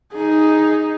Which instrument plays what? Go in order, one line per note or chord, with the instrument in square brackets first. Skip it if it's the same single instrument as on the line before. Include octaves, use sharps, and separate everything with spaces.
[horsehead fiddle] D#4 G#4